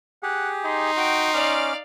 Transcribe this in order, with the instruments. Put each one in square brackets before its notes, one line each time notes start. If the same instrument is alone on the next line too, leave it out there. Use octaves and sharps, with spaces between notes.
[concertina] G4 G#4 [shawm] F#5
[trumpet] D#4 [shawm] C6
[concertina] F#4 [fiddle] G5
[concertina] C#4 D6 F6 [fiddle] D5 F5